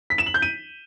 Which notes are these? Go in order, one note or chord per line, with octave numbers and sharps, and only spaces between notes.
B6
E7
F#7
G6
D#7